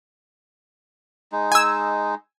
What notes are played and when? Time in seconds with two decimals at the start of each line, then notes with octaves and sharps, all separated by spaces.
1.32 G#3 D#4
1.52 G#5 E6